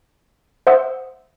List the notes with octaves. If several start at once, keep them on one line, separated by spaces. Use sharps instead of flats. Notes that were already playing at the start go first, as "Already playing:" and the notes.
C5 E5 F#5 C6 D#6 E6